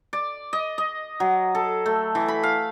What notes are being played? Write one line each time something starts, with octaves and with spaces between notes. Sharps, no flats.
D5
D#5
D#5
F#3
A4
A3
E3
B5
F5